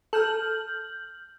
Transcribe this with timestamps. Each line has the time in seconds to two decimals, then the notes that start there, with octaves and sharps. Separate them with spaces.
0.13 A4 F6 G6 F#7